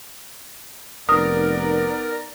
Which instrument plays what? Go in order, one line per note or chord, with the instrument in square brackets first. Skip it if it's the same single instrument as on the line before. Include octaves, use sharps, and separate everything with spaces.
[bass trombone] F1 [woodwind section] B3 D#4 D5 [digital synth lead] A#4 [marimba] D#6